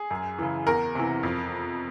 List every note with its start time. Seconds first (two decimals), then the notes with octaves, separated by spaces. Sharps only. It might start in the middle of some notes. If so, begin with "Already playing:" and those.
Already playing: G#4
0.11 F#2
0.39 C#3 E3
0.67 E2 A#4
0.95 C3 E3
1.23 F2